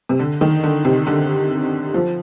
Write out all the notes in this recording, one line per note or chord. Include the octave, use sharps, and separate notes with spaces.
C3
D3
D#3
D3
C3
D3
F3